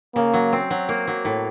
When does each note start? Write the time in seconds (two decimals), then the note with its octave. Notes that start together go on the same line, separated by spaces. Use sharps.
0.15 C#3 A#3
0.34 F#3
0.53 C4
0.70 F#3
0.89 A#3
1.07 F#3
1.25 A2